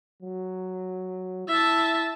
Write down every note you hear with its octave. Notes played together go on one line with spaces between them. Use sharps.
F#3
E4 E5 A5